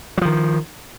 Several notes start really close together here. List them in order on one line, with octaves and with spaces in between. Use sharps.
F#3 F3 D#3